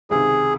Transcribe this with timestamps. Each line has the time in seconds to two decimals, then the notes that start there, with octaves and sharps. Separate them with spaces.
0.11 C#2 C3 D#3 G#4